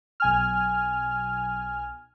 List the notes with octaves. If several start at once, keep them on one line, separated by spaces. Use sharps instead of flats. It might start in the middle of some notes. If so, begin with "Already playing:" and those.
B1 G#5 F6